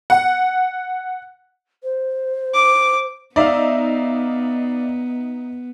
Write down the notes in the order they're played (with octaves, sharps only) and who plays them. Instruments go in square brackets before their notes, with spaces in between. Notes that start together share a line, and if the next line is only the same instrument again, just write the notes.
[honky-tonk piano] F#5
[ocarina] C5
[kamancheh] D6
[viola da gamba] B3 [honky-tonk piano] D#4 E5 [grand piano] D5 F5